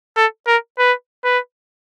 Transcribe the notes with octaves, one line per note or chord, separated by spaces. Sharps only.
A4
A#4
B4
B4